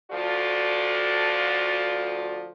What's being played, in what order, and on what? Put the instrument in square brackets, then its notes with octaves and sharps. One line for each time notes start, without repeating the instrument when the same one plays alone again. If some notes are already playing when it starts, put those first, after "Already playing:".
[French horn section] D2 F3 F4 F#4 A4 D5